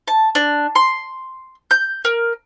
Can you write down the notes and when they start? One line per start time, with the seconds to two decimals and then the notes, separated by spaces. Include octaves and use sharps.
0.08 A5
0.35 D4
0.75 C6
1.71 G6
2.05 A#4